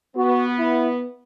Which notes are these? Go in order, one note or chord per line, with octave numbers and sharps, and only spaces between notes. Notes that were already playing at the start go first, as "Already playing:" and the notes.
B3 F#4
E4